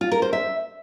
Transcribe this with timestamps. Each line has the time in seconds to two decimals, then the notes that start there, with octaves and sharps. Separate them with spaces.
0.01 F4
0.12 A#4
0.22 C5
0.33 E5